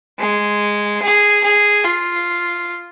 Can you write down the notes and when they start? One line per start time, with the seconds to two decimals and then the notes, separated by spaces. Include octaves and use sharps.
0.19 G#3
1.02 G#4
1.44 G#4
1.85 F4